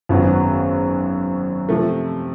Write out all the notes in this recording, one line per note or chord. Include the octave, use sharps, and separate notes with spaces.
G#1 F#2 C#3 F#3 B3
C3 F3 A3